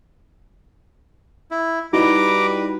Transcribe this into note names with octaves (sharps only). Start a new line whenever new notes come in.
E4
G3 D#4 E4 F#4 B4 A#5 D6